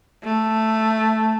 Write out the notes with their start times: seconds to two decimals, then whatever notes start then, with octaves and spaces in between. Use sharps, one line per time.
0.24 A3